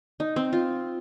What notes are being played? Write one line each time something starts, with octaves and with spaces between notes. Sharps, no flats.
D#4
C4
F4